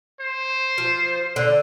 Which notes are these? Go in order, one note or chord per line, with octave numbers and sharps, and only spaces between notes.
C5
F3
D3